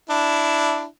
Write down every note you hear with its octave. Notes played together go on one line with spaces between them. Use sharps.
D4 E4